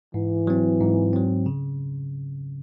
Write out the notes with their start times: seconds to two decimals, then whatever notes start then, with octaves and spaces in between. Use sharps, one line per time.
0.14 G#2 E3
0.47 F#3 C4
0.80 G#2
1.13 F#3 C4
1.46 C#3